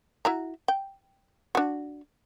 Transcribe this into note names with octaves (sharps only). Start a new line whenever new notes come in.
E4 F#4 A#5
G5
D4 F#4